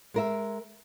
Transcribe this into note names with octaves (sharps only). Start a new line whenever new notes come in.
G#3 A#4 E5